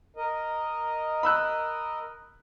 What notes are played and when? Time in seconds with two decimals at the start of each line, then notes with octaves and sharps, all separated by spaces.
0.16 A#4 D#5
1.23 B5 E6 F#6